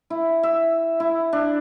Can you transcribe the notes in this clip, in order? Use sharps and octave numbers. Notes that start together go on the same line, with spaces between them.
E4
E5
E4
D4